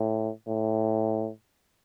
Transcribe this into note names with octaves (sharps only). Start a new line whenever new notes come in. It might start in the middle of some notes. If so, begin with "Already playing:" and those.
Already playing: A2
A2